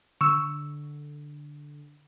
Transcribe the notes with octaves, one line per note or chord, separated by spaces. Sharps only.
D3 C#6 E6